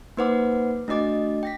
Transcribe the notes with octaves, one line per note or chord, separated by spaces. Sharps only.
A#3 D#4 B4 C5 F#5 D6
A3 D4 F#4 D#5 D6 A6
G5 A#6 B6